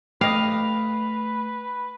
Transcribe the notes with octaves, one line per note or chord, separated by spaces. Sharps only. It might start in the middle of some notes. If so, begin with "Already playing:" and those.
A3 G4 B4 D#5 F5